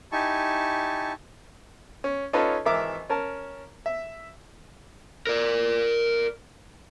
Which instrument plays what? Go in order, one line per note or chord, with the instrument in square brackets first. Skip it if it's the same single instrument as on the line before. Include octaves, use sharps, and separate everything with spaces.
[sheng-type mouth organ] D#4 E4 G4 G#5 A5 C#6
[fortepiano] C#4
C#4 D#4 F4 A4 B4 C#5
G#1 E3 A#4 E5 D6
C#4 A#4 A5
E5
[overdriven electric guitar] A#4 D5